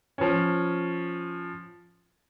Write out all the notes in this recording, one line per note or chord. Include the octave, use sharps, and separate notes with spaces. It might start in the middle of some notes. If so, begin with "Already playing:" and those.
F3 C#4